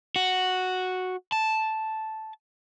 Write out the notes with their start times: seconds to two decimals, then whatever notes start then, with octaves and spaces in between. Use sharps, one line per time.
0.16 F#4
1.32 A5